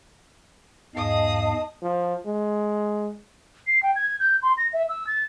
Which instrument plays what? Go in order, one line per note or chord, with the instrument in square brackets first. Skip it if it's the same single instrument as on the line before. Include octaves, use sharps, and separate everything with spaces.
[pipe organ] E2 G#2 F5 [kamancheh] G#4 D#6 [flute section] D#5 A5
[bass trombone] F3
G#3
[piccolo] C7
G5
G#6
G6
C6
A#6
E5
E6
A6